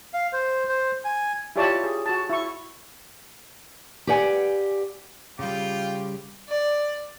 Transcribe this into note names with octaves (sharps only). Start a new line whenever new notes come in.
F5
C5
C5
G#5
E4 F4 G4 C#5 D5 A5
G#4
F#4 A5
E4 C#6
G4 B4 D5 F#5 G#5
C#3 G3 F4 G5 D6
D5